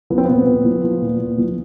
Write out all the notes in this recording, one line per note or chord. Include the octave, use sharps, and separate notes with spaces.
F3 B3
C4
A#2 B3
A#2
F3
F3
A#2
A#2
F3